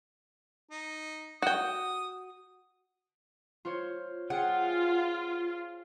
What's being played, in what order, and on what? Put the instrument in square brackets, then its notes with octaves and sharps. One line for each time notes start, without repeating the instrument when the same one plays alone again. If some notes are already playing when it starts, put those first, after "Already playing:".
[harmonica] D#4
[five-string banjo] F#4 G5 [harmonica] D#6
[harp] F4 C5 C#5
[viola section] F4 [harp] G#4 G5 [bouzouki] F#5